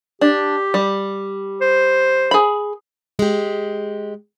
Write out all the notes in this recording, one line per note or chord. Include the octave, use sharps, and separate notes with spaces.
D4 G4
G3
C5
G#4 B5
G#3 G4